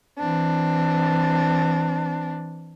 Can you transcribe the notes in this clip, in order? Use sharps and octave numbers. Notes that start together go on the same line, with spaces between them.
E3 C4 D4